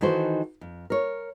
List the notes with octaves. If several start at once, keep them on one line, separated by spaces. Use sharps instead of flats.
D#3 E3 D#4 F#4 A4 C5
F2
A#4 C#5